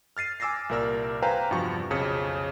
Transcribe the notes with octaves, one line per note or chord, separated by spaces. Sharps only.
F6 A6 C7 D#7
G#5 D6 E6 A6 A#6 C7
C2 A#2 A#4 D5 E6 F6
B4 C5 F5 G5 G#5 A#5
E2 G2 C3 F3 F#4 C#6
B1 F2 C#3 C#7